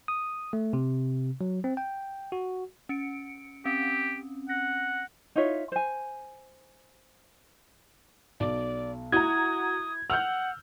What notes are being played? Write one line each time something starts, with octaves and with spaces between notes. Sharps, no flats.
D#6
A3
C3
F#3
C4
G5
F#4
C#4 C#7 D7
C4 C#4 G4
F#5 A#6
D#4 F4 C#5 E5
C5 G#5
B1 D5
E4 F#4 A#5 D#6 G#6
F#5 E6 F6 G6 F7